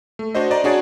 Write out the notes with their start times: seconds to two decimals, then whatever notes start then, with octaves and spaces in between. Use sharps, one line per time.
0.19 A3
0.35 D4 F#4 C5 D#5
0.51 D5 D#5 A#5
0.64 D4 F#4 G#4 C#5 D5